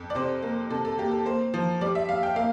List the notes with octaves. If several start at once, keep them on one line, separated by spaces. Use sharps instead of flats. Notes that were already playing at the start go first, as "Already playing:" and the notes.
Already playing: F2
D5
C3 C5
A#3
C3 A4
A4
A#3 G4
A4
A#3 C5
F3
G3 D5
E5
G3 F5
G5
A#3 F5